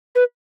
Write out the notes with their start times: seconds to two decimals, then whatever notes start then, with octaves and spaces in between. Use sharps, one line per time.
0.15 B4